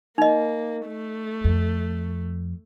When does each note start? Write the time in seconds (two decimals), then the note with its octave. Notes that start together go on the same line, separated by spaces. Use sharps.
0.18 A#3 D#4 D#5
0.87 A3
1.44 F2